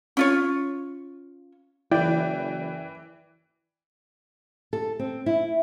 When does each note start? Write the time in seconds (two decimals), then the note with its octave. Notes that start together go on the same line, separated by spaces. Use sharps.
0.17 C#4 F4 C#5
1.92 F#1 E3 E4 D5 G5
4.73 A4
4.99 C4
5.26 E4